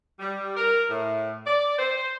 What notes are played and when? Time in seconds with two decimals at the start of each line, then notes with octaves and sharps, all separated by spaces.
0.19 G3
0.57 A#4
0.89 A2
1.46 D5
1.78 C5